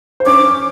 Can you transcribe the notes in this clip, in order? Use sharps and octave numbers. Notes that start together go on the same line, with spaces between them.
C5
C#4 C#5 D6